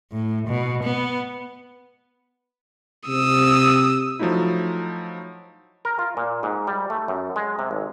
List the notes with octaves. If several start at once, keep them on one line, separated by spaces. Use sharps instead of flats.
A2
B2
B3
C3 D#6 E6
F3 F#3 A3 D#4 E4
A#4
F4
A#2
G#2
G3
A3
F#2
G#3
C3
G#1